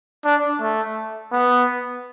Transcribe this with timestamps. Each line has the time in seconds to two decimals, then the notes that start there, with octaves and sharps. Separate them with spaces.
0.25 D4
0.60 A3
1.32 B3